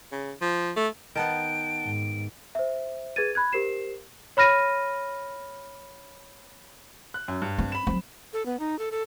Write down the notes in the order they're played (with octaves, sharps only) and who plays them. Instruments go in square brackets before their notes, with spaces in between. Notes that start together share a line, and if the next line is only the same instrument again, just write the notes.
[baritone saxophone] C#3
F3
A3
[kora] D#3 B3 [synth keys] F#5 A5 G6 [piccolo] D7
[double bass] G#2
[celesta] C5 E5
G#4 B4 G#6 A6 D#7
B5 F#6 G#6
G4 A#4 C5 C7 E7
C#5 B5 F6 A#6 D#7
[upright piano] F#6
F#2
G2
[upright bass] C4
[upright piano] B5 E7
[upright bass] F#3 C4
[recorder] A4
B3
D#4
A4
A4